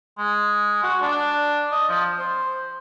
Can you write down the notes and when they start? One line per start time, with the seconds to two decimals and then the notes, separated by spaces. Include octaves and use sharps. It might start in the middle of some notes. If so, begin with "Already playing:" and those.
0.18 G#3
0.83 F#4
1.01 D4
1.72 D#5
1.89 F3
2.18 C5